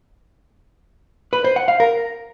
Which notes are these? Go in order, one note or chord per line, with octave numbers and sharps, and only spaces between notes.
B4
C5
F#5
F5
A#4